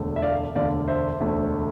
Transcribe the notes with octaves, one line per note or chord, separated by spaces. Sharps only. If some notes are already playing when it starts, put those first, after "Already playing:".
Already playing: E1 D2 D3 A3
E5
D5 F5
E1 D2 D3 A3 D5 F5
C5 E5
E1 D2 D3 A3